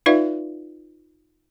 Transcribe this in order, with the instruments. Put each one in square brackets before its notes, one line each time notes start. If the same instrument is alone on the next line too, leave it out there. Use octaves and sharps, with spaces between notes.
[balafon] D#4 F4 B4 D5 E5 F5